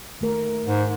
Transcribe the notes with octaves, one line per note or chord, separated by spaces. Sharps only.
D#3 A3 A#4
G#2